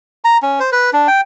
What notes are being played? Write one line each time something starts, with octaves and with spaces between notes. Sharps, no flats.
A#5
C#4
C5
B4
D4
G5